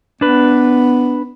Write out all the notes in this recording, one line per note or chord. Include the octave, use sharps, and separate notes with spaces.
B3 D4 B4